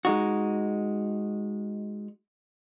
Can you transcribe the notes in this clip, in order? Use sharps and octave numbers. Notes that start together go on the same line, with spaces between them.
G#3 D#4 F#4